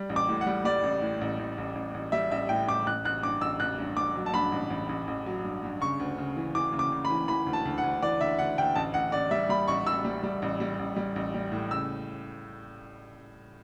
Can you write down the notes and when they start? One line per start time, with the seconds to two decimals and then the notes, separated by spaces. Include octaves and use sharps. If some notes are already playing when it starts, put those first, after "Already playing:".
Already playing: G3
0.09 A1
0.16 D6
0.29 A2
0.41 F#5
0.47 G3
0.65 G3 D5
0.83 A1
1.02 A2
1.21 A1
1.39 A1
1.58 A1
1.75 A1
1.94 A1
2.12 G3 E5
2.31 A1 E5
2.49 A2 G5
2.67 A1 D6
2.87 A1 F#6
3.05 A1 F#6
3.23 G2 D6
3.41 A1 E6
3.60 A1 F#6
3.79 G2
3.97 G2 D6
4.15 F#3
4.26 A5
4.34 G2 B5
4.52 A1
4.70 A1
4.89 A1
5.07 A1
5.26 F#3
5.44 G2
5.63 G2
5.81 C#3 C#6
5.99 D2
6.18 C#3
6.37 E3
6.55 E3 D6
6.73 C#3
6.79 D6
6.92 C#3
7.05 B5
7.10 E3
7.28 E3 B5
7.47 D2
7.53 A5
7.65 D2
7.78 F#5
7.84 D2
8.02 E3 D5
8.21 D2 E5
8.39 D2 F#5
8.58 D2 G5
8.75 A1 A5
8.94 A1 F#5
9.12 A1 D5
9.31 G3 E5
9.49 G3 B5
9.68 A1 C#6
9.86 A1 E6
10.05 G3
10.23 G3
10.42 A1
10.60 G3
10.79 A1
10.96 G3
11.16 A1
11.34 G3
11.52 A2
11.71 C#3 E6